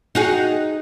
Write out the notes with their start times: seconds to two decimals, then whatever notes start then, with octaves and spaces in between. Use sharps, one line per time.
0.15 D#4 F#4 G#4